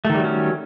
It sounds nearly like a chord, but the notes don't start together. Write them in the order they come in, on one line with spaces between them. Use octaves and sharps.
A3 D#3 G3 F#3 C#4